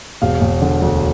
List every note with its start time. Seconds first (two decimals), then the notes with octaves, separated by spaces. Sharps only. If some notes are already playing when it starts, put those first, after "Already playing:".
0.22 E1 F5
0.41 E1
0.62 D3
0.81 D2